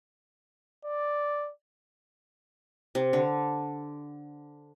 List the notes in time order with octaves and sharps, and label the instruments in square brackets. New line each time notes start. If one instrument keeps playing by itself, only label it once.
[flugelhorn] D5
[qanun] C3
D3